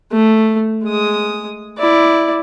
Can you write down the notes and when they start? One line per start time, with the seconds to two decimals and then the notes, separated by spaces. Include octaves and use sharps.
0.11 A3
0.84 G#3 D#6
1.79 E4 D5